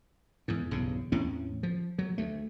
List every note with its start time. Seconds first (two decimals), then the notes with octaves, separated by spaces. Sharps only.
0.48 E2 G#2
0.71 B1 E2 G2 C#3
1.12 E2 A2 C4 C#4
1.63 F3
1.98 F#3
2.18 D2 A3